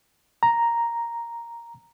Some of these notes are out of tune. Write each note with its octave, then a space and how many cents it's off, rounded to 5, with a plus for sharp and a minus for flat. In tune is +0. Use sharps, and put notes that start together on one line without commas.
A#5 +0